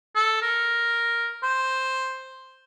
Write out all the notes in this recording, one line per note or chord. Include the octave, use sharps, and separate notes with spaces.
A4
A#4
C5